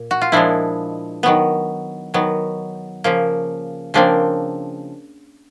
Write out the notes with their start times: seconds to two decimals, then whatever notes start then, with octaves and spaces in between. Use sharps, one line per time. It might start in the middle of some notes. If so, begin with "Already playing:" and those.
Already playing: A#2
0.11 F#4
0.21 F4
0.32 A#2 F3 G#3 D4 E4
1.23 D#3 F#3 B3
2.14 D#3 F#3 B3
3.04 C#3 F3 A#3
3.94 C#3 F3 A#3 C4 D4